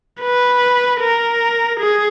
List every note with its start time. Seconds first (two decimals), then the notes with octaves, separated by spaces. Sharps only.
0.22 B4
1.01 A#4
1.80 G#4